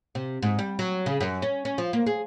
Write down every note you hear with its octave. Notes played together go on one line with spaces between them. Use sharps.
C3
G#2
G3
F#3
C#3
F#2
C#4
C#4
F3
A#3
G#4